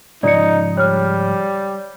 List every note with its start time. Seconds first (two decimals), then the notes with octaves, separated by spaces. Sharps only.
0.23 G#2 C#3 F3 D#4 D5 C#7
0.77 G3 C#5 F6